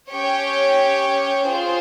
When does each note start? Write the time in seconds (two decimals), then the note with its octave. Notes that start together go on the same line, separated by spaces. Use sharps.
0.11 C#4 G4 C#5 G5
1.48 F4 G#4 C5